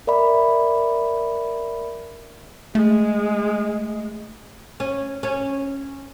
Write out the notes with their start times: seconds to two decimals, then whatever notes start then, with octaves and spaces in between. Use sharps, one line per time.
0.07 A#4 D5 E5 B5
2.75 G#3 A3
4.80 C#4
5.23 C#4